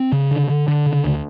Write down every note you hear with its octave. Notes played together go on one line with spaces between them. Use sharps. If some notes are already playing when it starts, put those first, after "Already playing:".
Already playing: C4
C#3
D3
D3
D3
C#3
D2